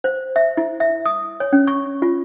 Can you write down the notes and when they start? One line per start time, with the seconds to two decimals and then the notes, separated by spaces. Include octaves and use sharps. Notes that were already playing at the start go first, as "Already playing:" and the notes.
0.04 C5
0.36 E5
0.57 E4
0.80 E5
1.06 D#6
1.40 C#5
1.53 C#4
1.67 C#6
2.02 F4